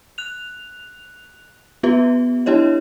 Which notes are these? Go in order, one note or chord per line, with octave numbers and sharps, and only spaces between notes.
F#6 F7
B3 F4 G4 B4 E5
D4 E4 G4 C#5 D#5